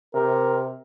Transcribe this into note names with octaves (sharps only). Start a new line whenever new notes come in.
C3 A#4